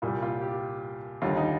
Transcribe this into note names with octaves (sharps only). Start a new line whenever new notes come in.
C2 A#2 G3 F4
F4
G4
D#2 D3 G3 F4
D#4